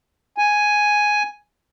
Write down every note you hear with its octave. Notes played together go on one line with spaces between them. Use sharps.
G#5